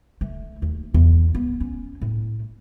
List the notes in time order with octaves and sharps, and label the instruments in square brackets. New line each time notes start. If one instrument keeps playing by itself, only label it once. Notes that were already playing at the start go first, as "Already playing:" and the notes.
[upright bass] A3
D#2
E2
B3
C#4
A2